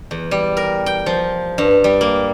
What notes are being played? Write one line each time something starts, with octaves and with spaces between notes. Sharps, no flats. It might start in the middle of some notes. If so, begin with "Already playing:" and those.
E2
G3
A#4
G5
F3
G2
G3
A#3